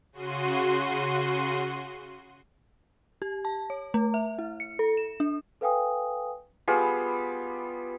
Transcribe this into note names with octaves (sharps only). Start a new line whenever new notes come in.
C#3 F#4 C6 D#7
G4
A5
C#5
A3
E5
E4
C#7
A4
E7
D4
A4 B4 F5 G5 G#5 D#6
G3 B3 F4 G#4